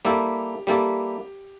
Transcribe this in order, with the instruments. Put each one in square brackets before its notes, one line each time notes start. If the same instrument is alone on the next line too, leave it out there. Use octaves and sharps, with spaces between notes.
[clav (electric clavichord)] G3 A#3 E4 A4 [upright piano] G4
[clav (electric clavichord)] G3 A#3 E4 A4 [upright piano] G4